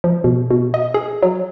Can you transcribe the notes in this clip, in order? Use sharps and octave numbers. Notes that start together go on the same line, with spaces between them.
F3
B2
B2
D#5
G#4
F#3